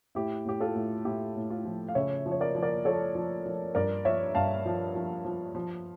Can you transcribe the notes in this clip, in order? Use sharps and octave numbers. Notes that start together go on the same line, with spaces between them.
A2 E4 G4
A2 G4
F4 A4
A2
A2 E4 G4
A2
F4
F3
F5
C#3 C#5 E5
F3
C#5
A#4 D5
F3
A#4 D5
F3 A4 C#5
F3
F3
G2 A#4 D5
F3 C#5 E5
G2 F5 A5
F3
F3
F3
F3